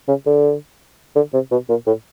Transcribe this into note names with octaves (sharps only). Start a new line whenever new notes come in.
C#3
D3
D3
C3
B2
A#2
A2